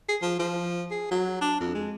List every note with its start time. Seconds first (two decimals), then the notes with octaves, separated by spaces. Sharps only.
0.09 G#4
0.22 F3
0.39 F3
0.91 G#4
1.11 F#3
1.41 D4
1.60 F2
1.75 G#3